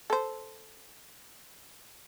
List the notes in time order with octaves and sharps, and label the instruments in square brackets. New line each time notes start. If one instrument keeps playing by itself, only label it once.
[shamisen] A4 C5